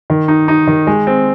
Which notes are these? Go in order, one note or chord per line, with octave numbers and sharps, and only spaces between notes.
D#3
D#4
D#4
D#3
G#3
C4